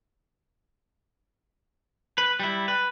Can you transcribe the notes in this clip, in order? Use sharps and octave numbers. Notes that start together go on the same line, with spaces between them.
B4
G3 E4
B4